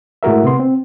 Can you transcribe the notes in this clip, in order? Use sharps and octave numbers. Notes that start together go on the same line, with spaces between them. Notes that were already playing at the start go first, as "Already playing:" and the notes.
A2 G#3 F#4 A#4 E5
C3 B3 C6
C4